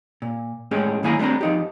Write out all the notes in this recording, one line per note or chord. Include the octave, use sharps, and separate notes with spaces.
A#2
A2 G#3 C#4 G4 G#4
F#2 D#3 A#3 E4 G#5 A#5
G3 A3 C4 D4 A#5
F3 D#4 G4